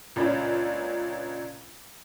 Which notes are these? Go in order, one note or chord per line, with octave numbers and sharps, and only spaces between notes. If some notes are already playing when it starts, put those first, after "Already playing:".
C#2 A#2 C#4 D4 D5 B5